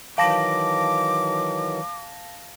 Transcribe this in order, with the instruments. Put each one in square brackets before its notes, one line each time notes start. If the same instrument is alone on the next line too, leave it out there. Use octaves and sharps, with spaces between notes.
[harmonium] D#3 E3 F#3 [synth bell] F5 A5 A#6 [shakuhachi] D6